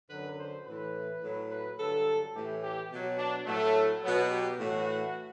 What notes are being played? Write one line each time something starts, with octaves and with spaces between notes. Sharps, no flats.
F#2 D3 F#3 B4
C5
A2 E3 B4
A2 F#3
B4
G2 D3 F#3 A4
A2 E3 G4
G4
B2 F#3
D4
A2 F#3 A3
B2 F#3 B3
G4
A2 E3 F#4